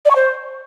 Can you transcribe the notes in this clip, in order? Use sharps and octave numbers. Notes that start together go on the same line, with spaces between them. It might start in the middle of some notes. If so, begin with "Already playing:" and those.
D5
C#6
C5